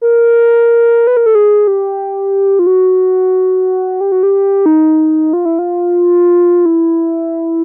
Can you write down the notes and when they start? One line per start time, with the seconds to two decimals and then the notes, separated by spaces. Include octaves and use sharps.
0.01 A#4
1.07 B4
1.17 A#4
1.26 A4
1.35 G#4
1.67 G4
2.59 F4
2.67 F#4
4.01 G4
4.12 F#4
4.23 G4
4.66 D#4
5.33 F4
5.45 E4
5.59 F4
6.66 E4